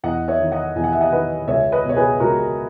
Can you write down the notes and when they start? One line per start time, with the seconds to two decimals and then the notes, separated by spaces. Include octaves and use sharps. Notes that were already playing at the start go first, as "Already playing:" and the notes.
0.03 E2 D#5 F#5
0.28 C#5 E5
0.40 D#3
0.52 D#5 F#5
0.76 E2 G#5
0.84 F#5
0.93 E5
1.01 D#5 F#5
1.12 D#3 B4 D#5
1.48 C#2 C#5 E5
1.72 B4 D#5
1.84 B2
1.89 C#5
1.96 G#4 B4
2.20 C#2 F#4 A#4